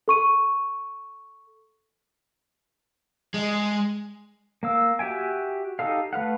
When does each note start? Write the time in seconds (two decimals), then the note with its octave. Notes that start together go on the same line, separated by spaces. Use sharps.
0.08 A4 C#6 D#7
3.34 G#3
4.63 A#3 F5 E6
4.99 F#4 G4 E5 G5 G#5
5.79 D#4 G4 A4 F5
6.13 A3 B4 F5 F#5